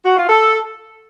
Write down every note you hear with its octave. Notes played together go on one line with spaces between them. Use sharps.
F#4
F4
A4